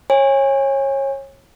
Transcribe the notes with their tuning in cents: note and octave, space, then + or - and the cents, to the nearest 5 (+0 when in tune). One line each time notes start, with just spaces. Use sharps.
C#5 -25 G#5 -25